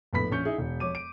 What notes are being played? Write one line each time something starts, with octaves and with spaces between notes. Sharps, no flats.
A#1 A2 B3 B5 B6
A#1 C#4 C#6 G6 C#7
D#4 E4 G#4
E1
F2 C#5 D6 D#7
D7